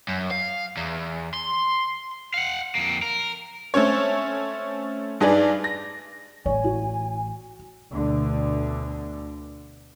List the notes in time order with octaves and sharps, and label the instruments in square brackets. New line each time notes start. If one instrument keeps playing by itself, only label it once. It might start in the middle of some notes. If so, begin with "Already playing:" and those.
[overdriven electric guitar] F#2
F5
E2
C6
F5 F#5
F2 A#3
A#4
[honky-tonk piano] A3 C4 C#4 C#5
G2 D#4 G#4 B4 D5
A#6
[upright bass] A1 [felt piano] C#5 [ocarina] G#5
[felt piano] F#4
[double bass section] D2 B2 D3